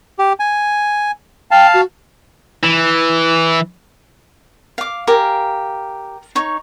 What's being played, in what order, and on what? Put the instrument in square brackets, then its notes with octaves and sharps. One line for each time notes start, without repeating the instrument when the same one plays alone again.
[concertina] G4
G#5
[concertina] F5 A5 [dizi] G5
[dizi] F#4
[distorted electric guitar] E3
[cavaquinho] F5 D6
G4 A#4 F5 G#5
D#4 C#5 C#6